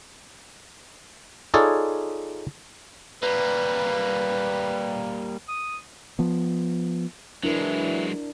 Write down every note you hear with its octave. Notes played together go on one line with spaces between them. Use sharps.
D#4 F4 G#4 A4 C#5 D5
G3 A#3 B4
D#6
F3 B3
E3 F#3 G#3 D4 E4 A#4